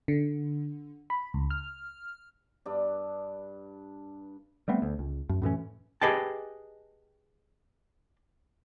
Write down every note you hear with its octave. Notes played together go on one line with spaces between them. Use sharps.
D3
B5
C#2
F6
G2 D4
G3 A3 B3 C4
D2
C#2
F#2
F#2 A2 E3 C#4
G4 G#4 B4 D#5 G5 A5